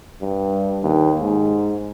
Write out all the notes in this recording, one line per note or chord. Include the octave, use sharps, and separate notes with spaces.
G2
D#2
G#2